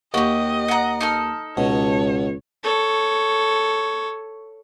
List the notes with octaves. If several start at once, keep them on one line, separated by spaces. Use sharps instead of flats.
D#2 F#4 G4 D#5
F#5 A#5
D#4 A4 F6
C#2 B2 C#5
A4 C#5